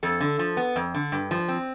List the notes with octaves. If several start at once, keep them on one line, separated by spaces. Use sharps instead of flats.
F2 A4
D3
F3
B3
F2
D3
G2
F3
C4